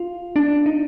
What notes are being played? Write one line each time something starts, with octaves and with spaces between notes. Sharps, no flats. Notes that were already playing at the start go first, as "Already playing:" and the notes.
Already playing: F4
D4
D#4